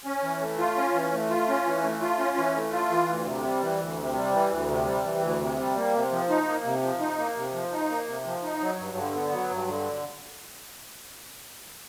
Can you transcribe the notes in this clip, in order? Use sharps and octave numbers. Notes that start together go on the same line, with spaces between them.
C#4
E3
A3
F4
C#4
E3
A3
F4
C#4
E3
A3
F4
C#4
E3
A3
F4
E3
D2
C3
G3
E3
D2
C3
G3
E3
D2
C3
G3
E3
D2
C3
G3
A#3
C3
F3
D#4
A#3
C3
F3
D#4
A#3
C3
F3
D#4
A#3
C3
F3
D#4
F#3
G2
D3
B3
F#3
G2
D3